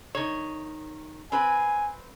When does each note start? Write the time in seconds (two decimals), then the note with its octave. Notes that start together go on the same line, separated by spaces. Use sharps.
0.15 D#3 C#5
1.32 C4 B4 G#5